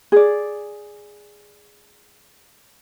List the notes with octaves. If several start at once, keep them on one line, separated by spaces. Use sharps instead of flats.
G#4 D5